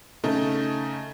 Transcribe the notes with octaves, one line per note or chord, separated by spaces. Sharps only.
C#3 A3 D#4 A4